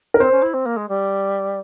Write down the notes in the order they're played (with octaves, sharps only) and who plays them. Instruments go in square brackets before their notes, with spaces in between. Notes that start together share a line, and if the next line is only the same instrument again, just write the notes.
[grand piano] A#4
[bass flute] C4 [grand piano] C5
[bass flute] C#4
E4
C4
A#3
G#3
G3